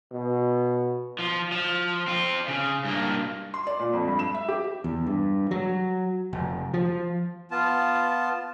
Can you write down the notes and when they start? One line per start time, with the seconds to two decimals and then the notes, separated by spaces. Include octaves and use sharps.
0.12 B2
1.19 F3
1.52 F3
2.08 C4 F4
2.48 C#3
2.85 G2 A#3
3.54 C6
3.67 D5
3.79 A#2
3.93 F2
4.08 G2
4.19 E7
4.34 E5
4.48 G4
4.84 E2
5.06 G2
5.51 F#3
6.33 F1
6.74 F3
7.51 B3 F4 A5